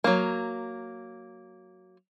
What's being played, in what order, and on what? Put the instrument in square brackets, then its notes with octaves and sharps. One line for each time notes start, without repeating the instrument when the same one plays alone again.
[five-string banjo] F#3 A#3